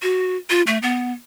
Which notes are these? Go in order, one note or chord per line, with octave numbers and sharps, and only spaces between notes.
F#4
F4
A3
B3